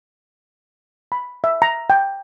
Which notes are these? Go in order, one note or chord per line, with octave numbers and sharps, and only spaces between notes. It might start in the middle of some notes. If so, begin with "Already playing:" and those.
B5
E5
A#5
G5